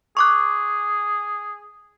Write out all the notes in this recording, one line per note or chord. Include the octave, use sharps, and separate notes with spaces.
G#4 C#6 D6 F#6